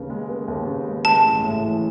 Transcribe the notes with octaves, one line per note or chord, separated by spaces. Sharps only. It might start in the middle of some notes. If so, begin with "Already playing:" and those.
Already playing: D#2 C#3 B3
G#3
B3
D#2
C#3
G#3
G#3 A5
A1
A2
E3